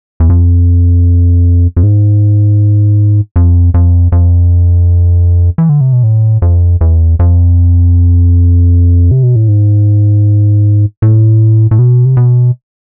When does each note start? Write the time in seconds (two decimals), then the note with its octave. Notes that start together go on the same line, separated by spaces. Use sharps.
0.20 E2
0.30 F2
1.77 F2
1.83 G#2
3.36 F2
3.74 F2
4.12 F2
5.58 E3
5.69 D3
5.81 C3
5.93 B2
6.03 A2
6.42 F2
6.81 E2
7.19 F2
9.11 C3
9.23 B2
9.36 A2
9.48 G#2
11.02 A2
11.71 A2
11.79 B2
12.05 C3
12.17 B2